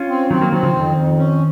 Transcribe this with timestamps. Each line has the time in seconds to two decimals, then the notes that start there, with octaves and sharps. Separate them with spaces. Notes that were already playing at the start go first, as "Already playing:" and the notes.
Already playing: C#4 F4
0.08 C4
0.30 D#3 F#3 C4
0.41 F#3 A#3
0.52 D#3 F#3 C4
0.63 C#3 F3
0.73 F2 D#3
0.95 F2
1.17 C#4